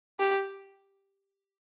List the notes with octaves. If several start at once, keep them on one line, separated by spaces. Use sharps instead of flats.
G4